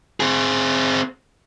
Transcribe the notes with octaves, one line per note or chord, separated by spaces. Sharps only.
C4 G#4